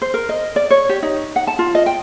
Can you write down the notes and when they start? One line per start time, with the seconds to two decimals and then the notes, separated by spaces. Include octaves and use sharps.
0.02 C5
0.14 A#4
0.29 D#5
0.56 D5
0.71 C#5
0.89 G4
1.02 D#4
1.36 F#5
1.47 A5
1.59 F4
1.75 D#5
1.86 G5